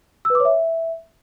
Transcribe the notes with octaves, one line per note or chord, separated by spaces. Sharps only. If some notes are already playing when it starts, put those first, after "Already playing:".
E6
B4
D6
C#5
E5